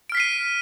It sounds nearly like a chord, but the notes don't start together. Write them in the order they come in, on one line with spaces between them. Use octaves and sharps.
D7 F6 B6 C7 D#7